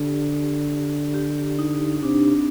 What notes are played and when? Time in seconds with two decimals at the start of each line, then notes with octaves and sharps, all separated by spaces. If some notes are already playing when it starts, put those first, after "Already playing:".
Already playing: D3 G4
1.14 G4
1.59 D#4
2.03 C3 D4
2.33 C4